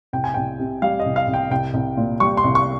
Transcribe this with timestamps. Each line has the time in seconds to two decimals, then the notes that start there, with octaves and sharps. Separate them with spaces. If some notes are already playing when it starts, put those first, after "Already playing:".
0.13 C2 G5
0.24 G#5
0.34 C2 G5
0.59 C3
0.82 G3 F5
1.00 D#5
1.06 C2
1.16 F5
1.27 C2
1.34 G5
1.51 C2 G5
1.74 C2
1.97 A#2
2.20 G3 C#6
2.37 C6
2.44 C2
2.55 C#6